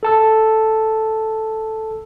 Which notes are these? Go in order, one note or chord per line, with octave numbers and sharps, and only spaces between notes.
A4 A5 E6